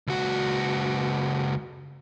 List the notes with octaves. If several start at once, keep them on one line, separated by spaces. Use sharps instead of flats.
C#2 F#4